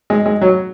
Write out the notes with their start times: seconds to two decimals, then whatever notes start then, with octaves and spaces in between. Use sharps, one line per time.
0.10 G#3
0.26 G#3
0.41 F#3